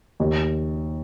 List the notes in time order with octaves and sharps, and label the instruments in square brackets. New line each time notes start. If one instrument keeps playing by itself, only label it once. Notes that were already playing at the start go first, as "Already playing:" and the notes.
[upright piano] D#2